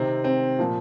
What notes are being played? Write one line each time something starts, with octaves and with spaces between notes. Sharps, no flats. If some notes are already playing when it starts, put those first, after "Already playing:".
Already playing: C3 D#3 C4
C4
A#2 F3